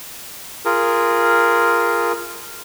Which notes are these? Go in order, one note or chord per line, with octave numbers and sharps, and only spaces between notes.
F4 G#4 A#4